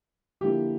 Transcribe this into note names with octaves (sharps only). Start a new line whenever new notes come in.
D3 F3 A#3 E4 G4